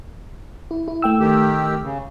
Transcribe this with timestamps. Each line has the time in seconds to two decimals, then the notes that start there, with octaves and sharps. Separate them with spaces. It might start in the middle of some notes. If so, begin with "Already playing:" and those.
0.71 E4
0.88 E4
1.02 A3 G5 E6
1.20 D#3 G4
1.83 C#3